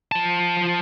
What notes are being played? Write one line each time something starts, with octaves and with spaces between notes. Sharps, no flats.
F3 A5